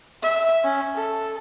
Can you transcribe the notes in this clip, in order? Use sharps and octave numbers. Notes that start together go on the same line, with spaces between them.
E5
C#4
A4